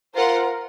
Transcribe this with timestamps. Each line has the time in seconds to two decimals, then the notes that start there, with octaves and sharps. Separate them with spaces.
0.15 F4 A#4 C5 F#5